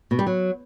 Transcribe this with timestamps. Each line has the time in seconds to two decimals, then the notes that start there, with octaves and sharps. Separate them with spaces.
0.11 B2
0.19 G3
0.26 F#3